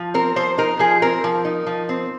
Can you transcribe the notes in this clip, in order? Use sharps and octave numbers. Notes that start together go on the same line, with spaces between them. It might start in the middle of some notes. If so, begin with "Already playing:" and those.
Already playing: F3
C4 A#4
F3 C5
D#4 A#4
F3 G#4
C4 A#4
F3
D#4
F3
C4